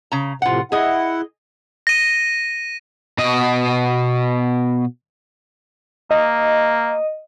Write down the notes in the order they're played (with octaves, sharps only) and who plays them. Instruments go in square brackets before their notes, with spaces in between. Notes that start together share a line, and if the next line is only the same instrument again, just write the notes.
[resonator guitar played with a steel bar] C#3 A#5
[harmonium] A2 C3 F3 [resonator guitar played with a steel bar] F4 F#5
[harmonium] E4 F#5 [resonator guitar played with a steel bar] G#4 D#5
[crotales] A#6 D#7
[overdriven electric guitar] B2 D#5
[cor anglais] A#3 [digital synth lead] D#5